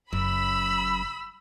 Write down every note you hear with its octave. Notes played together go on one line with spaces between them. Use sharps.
F#1 F#2 B5 E6